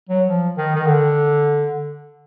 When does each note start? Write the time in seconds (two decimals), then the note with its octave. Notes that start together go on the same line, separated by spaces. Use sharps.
0.09 F#3
0.28 F3
0.57 D#3
0.75 D#3
0.86 D3